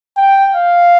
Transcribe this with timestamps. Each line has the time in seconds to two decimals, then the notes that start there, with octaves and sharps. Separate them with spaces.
0.17 G5
0.55 F5